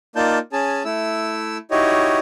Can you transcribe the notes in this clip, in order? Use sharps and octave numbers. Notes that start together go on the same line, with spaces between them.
A#3 D#4 F4 D5 A5 G6
C#4 G#4 A5
A3 E4 E6
D#4 E4 F#4 G4 C#5 D#5